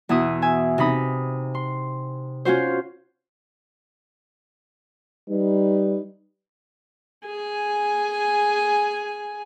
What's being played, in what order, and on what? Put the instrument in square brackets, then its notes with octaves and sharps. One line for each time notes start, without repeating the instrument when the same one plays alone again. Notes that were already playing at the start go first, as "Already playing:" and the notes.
[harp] E2 B2 E4 D#6
E5 G#5
C3 D#4 B5 D#6
C6
C#4 F4 F#4 C5
[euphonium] G3 [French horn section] D#4 B4
[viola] G#4 G#5